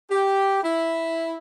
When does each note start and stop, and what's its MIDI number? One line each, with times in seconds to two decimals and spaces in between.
0.10 0.64 67
0.64 1.37 64